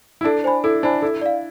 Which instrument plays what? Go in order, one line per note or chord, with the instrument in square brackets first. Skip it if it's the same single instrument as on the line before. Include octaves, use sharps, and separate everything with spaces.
[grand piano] E4
[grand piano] D4 [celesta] A4
[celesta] C5 G#5 B5
[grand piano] E4 [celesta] A4
[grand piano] D4 [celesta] C5 G#5 B5
[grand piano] E4 [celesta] A4
[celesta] D5 F5